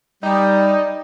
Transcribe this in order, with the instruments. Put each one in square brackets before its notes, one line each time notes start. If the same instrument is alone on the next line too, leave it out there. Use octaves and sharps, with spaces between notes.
[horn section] G3 [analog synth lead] D#4 [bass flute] D5 [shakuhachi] G5